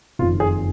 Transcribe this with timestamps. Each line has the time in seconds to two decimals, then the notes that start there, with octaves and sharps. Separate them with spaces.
0.19 F#1 F2 D#3 F4
0.40 G#4